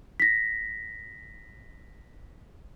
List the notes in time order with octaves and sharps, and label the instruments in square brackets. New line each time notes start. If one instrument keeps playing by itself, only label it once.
[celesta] A#6 B6